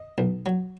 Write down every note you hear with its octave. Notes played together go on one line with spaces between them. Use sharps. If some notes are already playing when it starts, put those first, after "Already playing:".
Already playing: D#5
B1
F#3